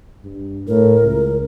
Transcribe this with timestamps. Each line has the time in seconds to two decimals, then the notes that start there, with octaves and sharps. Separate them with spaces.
0.23 G2
0.68 A2 A#4
1.03 C#2